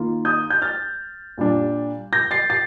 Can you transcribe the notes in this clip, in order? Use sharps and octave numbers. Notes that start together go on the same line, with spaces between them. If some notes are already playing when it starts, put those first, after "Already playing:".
Already playing: D#3 A#3 F4
D#6 G6
G6
F6 A6
A#2 G3 D4
G6 A#6
A6 C7
A6 C7